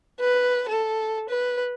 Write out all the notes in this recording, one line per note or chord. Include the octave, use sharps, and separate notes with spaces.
B4
A4
B4